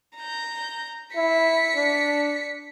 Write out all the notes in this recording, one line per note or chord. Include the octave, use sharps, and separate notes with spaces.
A#5 G6
E4 B6 C#7
D4